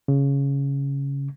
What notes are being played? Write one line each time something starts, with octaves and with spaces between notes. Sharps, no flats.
C#3